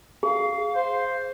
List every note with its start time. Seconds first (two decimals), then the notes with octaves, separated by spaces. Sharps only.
0.23 G#4 F5
0.75 C5